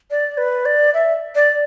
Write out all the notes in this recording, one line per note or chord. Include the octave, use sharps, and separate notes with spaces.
D5
B4
D5
E5
D5